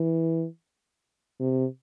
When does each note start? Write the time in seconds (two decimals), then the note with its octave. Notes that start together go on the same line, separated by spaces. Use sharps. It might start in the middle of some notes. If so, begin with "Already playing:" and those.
Already playing: E3
1.40 C3